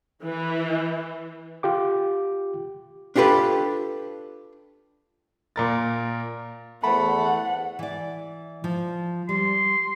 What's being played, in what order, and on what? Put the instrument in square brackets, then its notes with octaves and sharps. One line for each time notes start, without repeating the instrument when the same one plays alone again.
[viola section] E3
[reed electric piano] F4 G4 D6
[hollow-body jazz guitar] D4 F4 G4 A4 B4
[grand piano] A#2 A#4 A6
[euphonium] E2 [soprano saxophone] A3 [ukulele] C5 B5 [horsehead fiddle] F#5
[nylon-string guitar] E3 D5
F3
[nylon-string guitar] G3 [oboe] C6